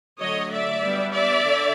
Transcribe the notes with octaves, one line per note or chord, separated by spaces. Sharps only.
D3 F#3 A3 C#5 D#5
D5 E5
G3 B3 D4
D5 E5
D3